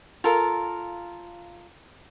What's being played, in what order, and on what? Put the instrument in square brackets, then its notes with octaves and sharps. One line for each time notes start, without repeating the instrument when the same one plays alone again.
[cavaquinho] F4 A4 A#4 F5